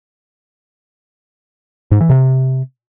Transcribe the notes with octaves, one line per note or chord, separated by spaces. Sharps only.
G#2
E3
C3